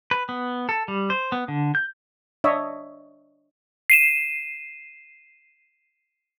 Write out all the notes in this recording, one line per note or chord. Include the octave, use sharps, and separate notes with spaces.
B4
B3
A4
G3
C5
B3
D3
G6
D4 C#5 D#5 E5
C7 D#7 E7